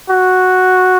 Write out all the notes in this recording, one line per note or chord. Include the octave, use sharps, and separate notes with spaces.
F#4